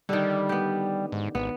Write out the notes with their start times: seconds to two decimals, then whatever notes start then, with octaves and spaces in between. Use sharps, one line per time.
0.09 D3 D#3 G3
0.49 B3 G4
1.12 G#2
1.35 G#1 B3